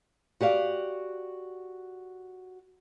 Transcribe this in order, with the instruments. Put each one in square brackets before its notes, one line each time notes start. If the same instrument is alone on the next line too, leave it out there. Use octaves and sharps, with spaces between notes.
[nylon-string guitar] F#4 G4 D5 F5